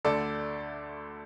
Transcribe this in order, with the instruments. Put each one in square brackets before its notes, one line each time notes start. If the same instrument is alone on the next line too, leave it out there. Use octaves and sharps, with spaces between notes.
[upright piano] D2 D3 A3 A4 D5